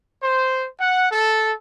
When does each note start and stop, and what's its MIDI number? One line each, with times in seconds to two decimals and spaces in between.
0.23 0.67 72
0.80 1.06 78
1.12 1.53 69